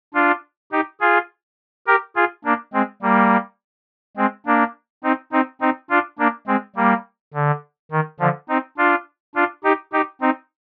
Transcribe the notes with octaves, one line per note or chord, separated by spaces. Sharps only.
D4 F4
D#4 G4
F4 G#4
G4 A#4
F4 G#4
A#3 D4
G#3 C4
G3 A#3
G#3 C4
A#3 D4
C4 D#4
C4 D#4
C4 D#4
D4 F4
A#3 D4
G#3 C4
G3 A#3
D3
D#3
D3 F3
C4 D#4
D4 F4
D4 F4
D#4 G4
D#4 G4
C4 D#4